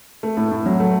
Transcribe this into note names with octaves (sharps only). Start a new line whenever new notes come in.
A3
A2
A2
F#3
A3